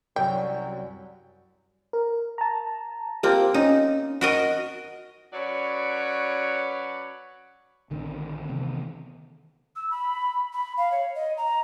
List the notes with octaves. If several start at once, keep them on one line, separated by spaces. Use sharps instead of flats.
C2 F#2 F#3 G5
A#4
A5 A#5
A#3 C4 F4 G4 C5
C#4 D#4
F#4 A#4 D#5
F#3 C#4 B4 C#5 D5
A#1 D3 D#3 C4
C3 D#3 E3 B3
E6
B5
B5
F5
C#5
D#5
A#5